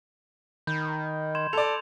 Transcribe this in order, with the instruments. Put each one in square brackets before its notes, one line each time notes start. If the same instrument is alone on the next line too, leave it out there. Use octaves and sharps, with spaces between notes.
[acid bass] D#3 [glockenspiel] B5 G6
[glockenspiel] C6 G#6 E7
[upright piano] A4 D5 [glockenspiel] F7